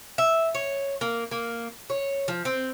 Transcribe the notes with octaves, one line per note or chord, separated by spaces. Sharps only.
E5
C#5
A#3
A#3
C#5
F3
C4